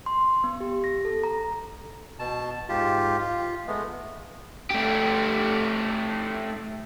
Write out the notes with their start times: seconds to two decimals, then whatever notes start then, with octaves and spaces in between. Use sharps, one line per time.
0.06 C6
0.44 B3
0.60 G4
0.84 A#6
1.05 A4
1.24 A#5
2.19 B2 A5
2.69 G#2 F4 G4
3.19 F4
3.68 G#3 A3 B3
4.70 A3 G4